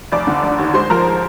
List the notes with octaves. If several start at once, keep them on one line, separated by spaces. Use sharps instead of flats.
F1 D5 D6
D3
F1
D#2
G#3 C5 C6
F3 A#4 A#5